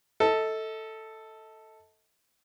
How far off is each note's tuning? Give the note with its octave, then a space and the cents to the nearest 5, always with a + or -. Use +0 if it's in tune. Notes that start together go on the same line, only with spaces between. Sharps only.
A4 +5 D#5 +40